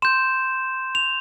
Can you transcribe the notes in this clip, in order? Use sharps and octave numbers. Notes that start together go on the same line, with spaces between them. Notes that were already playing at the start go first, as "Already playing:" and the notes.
C6 G6 E7
F7